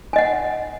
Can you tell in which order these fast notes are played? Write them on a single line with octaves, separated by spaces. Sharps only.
G#5 D#5 F#5